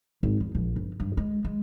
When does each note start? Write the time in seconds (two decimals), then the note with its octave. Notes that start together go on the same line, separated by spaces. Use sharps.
0.23 G#1
0.40 E2
0.55 A#1
0.76 G1
1.00 G2
1.17 G#3
1.45 G#3